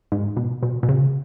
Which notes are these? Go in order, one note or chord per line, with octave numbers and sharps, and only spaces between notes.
G#2
B2
B2
B2
C#3